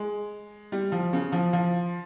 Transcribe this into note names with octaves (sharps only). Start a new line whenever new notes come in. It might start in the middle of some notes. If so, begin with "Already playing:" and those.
Already playing: G#3
G3
F3
C#3
F3
F3